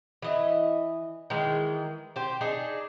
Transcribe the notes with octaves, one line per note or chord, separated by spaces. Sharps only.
E3 D#5 E5
D#3 E3 G#3
G4 C5
D4 D#4 G#4